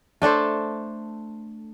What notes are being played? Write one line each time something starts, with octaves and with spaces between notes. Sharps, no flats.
A3 D4 A4 C5